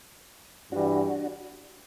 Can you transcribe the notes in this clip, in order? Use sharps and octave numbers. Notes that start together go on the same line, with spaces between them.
G2 E3 G3 D4 F#4